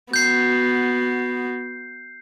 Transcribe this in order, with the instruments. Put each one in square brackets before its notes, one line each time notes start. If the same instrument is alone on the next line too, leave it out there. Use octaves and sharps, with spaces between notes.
[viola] B3 F#4 [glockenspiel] G6 C7